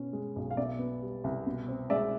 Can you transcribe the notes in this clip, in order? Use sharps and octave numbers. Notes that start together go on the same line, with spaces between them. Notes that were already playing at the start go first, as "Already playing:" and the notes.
Already playing: B2 C#4
G#3
B1
F5
B2 D5 E5
B3
G3
C2
B2
C4
G#3 D5 E5